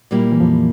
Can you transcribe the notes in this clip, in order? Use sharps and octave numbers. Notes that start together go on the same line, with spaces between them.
A#2 G3 A#3 E4
E3
F2 F3